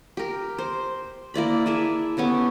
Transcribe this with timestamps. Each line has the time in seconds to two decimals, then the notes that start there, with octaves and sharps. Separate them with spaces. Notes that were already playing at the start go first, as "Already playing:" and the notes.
0.17 G4 A#4
0.58 C5
1.34 A#3 E4 D5 B5
1.66 E4 G#4 E5 A5
2.17 B3 C#4 G4 A4